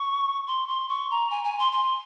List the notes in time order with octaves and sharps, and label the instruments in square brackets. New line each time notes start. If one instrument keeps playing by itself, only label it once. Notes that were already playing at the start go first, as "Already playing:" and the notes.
Already playing: [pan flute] C#6
C6
C6
C#6
A#5
G#5
G#5
C6
C6